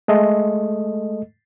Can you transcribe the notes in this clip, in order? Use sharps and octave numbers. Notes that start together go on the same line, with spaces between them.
G#3 A3 A4 D#5